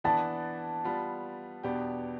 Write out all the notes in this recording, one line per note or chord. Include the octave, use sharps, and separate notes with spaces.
E3 B3 D4 A5
G3 B3 F4
E2 B2 B3 D4 G4